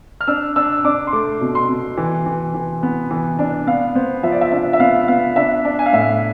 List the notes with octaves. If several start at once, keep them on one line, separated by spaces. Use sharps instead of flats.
F6
D4 E6
D4 E6
D4 D6
C6
A3 D6
B2
C6
B2
E3
E3
E3
B3
E3
D4
B3 F5
B3 C5
F3 E5
D5
E5
D4 E5
E5
B3 F5
B3 F5
D4 E5
D4
G#5
F5
A2 E5
F5